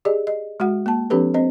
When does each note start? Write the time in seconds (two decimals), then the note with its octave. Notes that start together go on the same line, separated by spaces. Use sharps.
0.05 G4 G#4 D5 D#5
0.27 D#5
0.60 G#3 F#4 F#5
0.86 A#3 A5
1.10 F3 C4 D4 G4 A4 B4
1.34 C4 C5 D#5